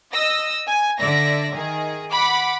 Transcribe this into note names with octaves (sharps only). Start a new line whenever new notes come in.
D#5 E6 A#6
G#5
D3 D5 E5 A#6
D#3 G#4
F#5 B5 D6